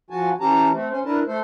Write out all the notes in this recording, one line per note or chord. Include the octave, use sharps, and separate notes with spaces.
F3 F#4 G#5 A5
E3 C#4 G4 A5 A#5
A3 C4
C#4 C5
D4 E4 A#4 B4 A5
A3 A4 C5